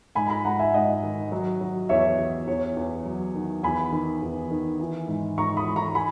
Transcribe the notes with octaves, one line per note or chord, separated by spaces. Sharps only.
G#2 G#5 B5
A#5
G#5 B5
G#2 F#5 A#5
E5 G#5
G#2 D#5 F#5
D#3
F#3
F#3
E2 C#5 E5
E2
E2 C#5
E2
F#3
D#3
E2 G#5 B5
D#3
E2
D#3
E3
G#2
G#2 A#5 C#6
B5 D#6
E3
A#5 C#6
G#5 B5